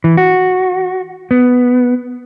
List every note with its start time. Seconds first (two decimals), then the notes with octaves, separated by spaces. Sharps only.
0.04 E3
0.17 F#4
1.31 B3